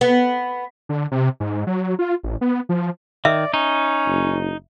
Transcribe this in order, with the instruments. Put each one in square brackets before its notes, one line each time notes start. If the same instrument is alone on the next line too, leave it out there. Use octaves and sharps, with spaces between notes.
[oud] B3
[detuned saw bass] D3
C3
G#2
F#3
F4
A1
B3
F3
[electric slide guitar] D#3 [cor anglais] D5 [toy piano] E5
[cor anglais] C#4 [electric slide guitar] D#4
[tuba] F#1